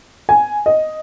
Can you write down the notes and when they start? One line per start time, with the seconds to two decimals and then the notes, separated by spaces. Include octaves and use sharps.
0.29 G#5
0.66 D#5